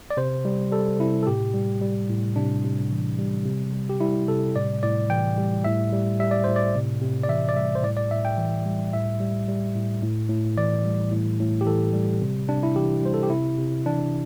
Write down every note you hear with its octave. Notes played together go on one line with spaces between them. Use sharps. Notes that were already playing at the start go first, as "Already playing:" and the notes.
D5
C3 C5
G3
G3 A4
C3 E4
A4
A2 G4
G3
G3
A2
C3 D4
C3
E3
G3
C3
G3
G4
G3 E4
C3 A4
A2 D5
A2 D5
E3 G5
G3
A2 E5
G3
G3 E5
D5
A2 C5
D5
C3
C3
D5
E3 E5
D5
G3 E5
C5
A2 D5
D5
A2 E5
G5
E3
G3
A2 E5
G3
G3
A2
A2
A2
E3 D5
G3
A2
A2
G4
E3 A4
G3
C3
C3 D4
E4
E3 G4
G3 C5
A4
G4
C3 E4
C3
E3 D4